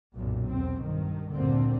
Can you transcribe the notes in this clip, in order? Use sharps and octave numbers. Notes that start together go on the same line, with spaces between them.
B1 F#2 A#2
E2 C4
G2 D#3
G1 D2 A#2 D3 A#3 C4